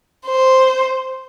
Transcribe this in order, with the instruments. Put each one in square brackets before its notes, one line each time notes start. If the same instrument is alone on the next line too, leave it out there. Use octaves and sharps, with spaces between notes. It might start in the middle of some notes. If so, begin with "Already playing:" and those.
[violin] C5